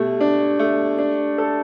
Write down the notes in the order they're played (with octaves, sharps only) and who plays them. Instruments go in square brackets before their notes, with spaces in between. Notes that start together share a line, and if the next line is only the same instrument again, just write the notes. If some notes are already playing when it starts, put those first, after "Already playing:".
Already playing: [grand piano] B2 A3 [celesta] G4
[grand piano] D4
A3
D4
A4